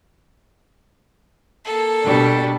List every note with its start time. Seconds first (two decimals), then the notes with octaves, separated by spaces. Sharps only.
1.65 A#3 A4
2.04 B2 G3 D4